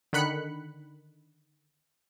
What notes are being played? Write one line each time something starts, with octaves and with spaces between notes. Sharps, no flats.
D3 D#3 B5 F#6 C#7